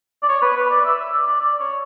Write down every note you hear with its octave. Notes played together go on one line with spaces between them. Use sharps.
D5
C#5
B4
B4
D5
E5
E5
D5
D5
D5
C#5